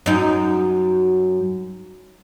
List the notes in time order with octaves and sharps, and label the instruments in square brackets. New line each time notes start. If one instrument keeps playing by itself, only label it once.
[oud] F#2 D#4